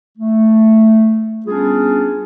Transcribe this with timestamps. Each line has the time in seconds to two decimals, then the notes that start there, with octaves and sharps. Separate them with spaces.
0.18 A3
1.46 G3 B3 C#4 D4 F4 G#4